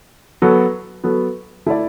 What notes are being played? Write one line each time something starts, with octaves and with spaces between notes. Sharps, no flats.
F#3 B3 F#4 A4
F#3 B3 F#4 A4
A3 E4 A4 D5